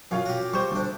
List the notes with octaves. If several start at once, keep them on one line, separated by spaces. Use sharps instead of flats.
F#2 F4 C#5 F5
F#4 G4
G3 C5 C#6
D2 D4